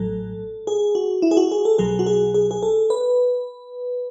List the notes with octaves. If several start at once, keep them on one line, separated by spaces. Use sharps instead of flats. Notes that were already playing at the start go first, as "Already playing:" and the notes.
Already playing: A1 A2 F#3 A4
G#4
F#4
E4
G#4
F#4
G#4
A4
B1 B2 F#3 G#4
F#4
G#4
G#4
G#4
A4
B4